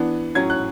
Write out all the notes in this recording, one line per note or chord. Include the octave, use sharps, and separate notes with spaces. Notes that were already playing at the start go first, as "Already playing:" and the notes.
Already playing: E3 B3 D4
A2 F#3 C#4 G#6
F#6